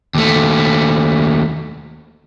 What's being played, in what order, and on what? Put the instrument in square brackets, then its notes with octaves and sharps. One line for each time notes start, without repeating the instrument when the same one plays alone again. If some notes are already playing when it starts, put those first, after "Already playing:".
[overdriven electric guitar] D#2 A3